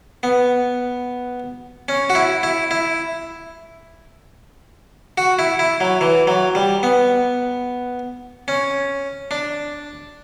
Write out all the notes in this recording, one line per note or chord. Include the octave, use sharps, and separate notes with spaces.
B3
C#4
F#4
E4
E4
E4
F#4
E4
E4
F#3
E3
F#3
G3
B3
C#4
D4